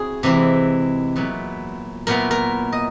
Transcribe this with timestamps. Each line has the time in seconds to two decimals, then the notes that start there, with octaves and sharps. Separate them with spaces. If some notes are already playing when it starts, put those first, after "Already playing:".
Already playing: C4 E4 F#4 G#4
0.23 C3 E3 G#3 C4 E4
1.16 A#2 F#3 B3 E4
2.07 A#2 F#3 B3 E4 A#4
2.31 A#4
2.72 D#5